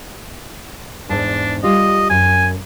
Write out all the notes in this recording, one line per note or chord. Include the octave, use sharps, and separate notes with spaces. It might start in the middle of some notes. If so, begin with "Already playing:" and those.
E2 G#2 D4 A5
G3 F4 G4 D#5
F#2 G#5